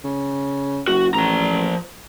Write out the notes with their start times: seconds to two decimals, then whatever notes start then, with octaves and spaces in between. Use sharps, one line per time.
0.04 C#3
0.88 F#1 F#4
1.14 A1 F3 A#5